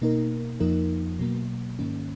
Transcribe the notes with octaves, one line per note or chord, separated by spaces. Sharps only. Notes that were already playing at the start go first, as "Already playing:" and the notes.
B2 A#3 D#4 A#4
F2 F3 A#3 D#4 A#4
B2 F#3 A#3
G#2 D#3 A#3 C#4